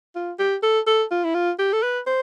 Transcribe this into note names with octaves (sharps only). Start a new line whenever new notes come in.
F4
G4
A4
A4
F4
E4
F4
G4
A4
B4
C5